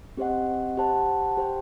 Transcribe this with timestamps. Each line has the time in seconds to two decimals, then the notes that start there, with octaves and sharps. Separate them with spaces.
0.17 C4 G4 C5 D#5 F#5
0.77 G4 C5 F#5 A5
1.37 G4 C5 G5